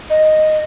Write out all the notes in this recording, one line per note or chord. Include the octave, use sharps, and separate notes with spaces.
D#5